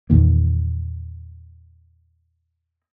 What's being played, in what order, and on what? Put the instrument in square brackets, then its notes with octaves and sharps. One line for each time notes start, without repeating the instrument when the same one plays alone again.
[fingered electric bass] E2 A#2 D#3 A#3